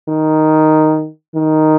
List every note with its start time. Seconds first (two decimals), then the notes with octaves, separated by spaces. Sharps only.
0.08 D#3
1.35 D#3